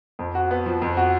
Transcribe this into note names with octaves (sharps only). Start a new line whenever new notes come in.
F2
F#4
B3
F3
F2
F#4